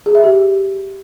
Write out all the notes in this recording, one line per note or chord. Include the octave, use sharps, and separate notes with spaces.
G#4
E5
G4